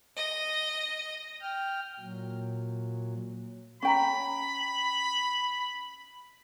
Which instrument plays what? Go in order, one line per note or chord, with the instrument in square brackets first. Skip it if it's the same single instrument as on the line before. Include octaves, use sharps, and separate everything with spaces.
[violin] D#5
[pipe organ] G5 F6
A#2 F#3
[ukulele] C#4 G5 A#5 [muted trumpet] B5